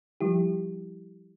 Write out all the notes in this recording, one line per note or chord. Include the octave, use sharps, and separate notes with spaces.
F3 G3 E4 G4